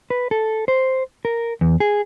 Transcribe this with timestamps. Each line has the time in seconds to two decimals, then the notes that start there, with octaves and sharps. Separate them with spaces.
0.10 B4
0.31 A4
0.68 C5
1.25 A#4
1.61 E2
1.80 G#4